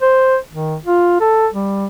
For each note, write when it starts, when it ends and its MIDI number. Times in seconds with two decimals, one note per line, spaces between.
0.02 0.37 72
0.52 0.76 51
0.86 1.17 65
1.20 1.48 69
1.53 1.87 55